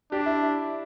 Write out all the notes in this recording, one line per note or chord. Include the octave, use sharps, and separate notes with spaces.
D4 G4
E4